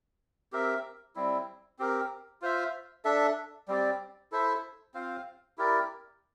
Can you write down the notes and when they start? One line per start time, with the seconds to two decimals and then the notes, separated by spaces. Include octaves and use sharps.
0.52 C4 G4 A#4 E5
1.16 G3 C4 E4
1.79 C4 G4 A#4
2.42 F4 C5 E5
3.05 D4 A4 E5
3.68 G3 C4 G4 D5
4.32 E4 A4 C5 E5
4.94 C4 F4 C5 F5
5.58 E4 G4 A#4 D5